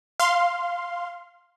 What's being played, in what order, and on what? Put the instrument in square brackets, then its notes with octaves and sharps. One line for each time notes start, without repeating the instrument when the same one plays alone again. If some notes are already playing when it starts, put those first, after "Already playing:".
[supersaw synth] F5 C6